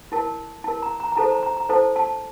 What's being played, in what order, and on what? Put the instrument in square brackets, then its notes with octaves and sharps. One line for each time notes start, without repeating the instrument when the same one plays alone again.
[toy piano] E4 A#4 A5
E4 A#4 A5
A#5
A#5
A#5
E4 A4 C5 A5
A#5
A#5
A#5
E4 A4 C5 A5
A5